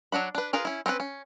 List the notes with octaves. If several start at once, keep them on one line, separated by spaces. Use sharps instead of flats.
F#3 D4 F#4 B5
D4 B4
F4 G#4 A#4 B4
C#4 E4
C4 C#4 D#4 B4
C#4